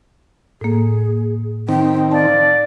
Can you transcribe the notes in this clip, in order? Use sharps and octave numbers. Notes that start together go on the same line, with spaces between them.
A2 A#3 G#4
D#3 C4 G5
D5 F5 A5